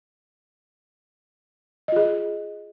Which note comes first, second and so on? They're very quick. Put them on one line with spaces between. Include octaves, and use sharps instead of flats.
D#5 F4 G#4